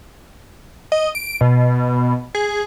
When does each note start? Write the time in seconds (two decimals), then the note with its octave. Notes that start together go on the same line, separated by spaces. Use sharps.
0.92 D#5
1.15 D7
1.41 B2
2.35 G#4